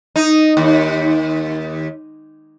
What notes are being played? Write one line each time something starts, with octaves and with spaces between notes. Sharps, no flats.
D#4
D#2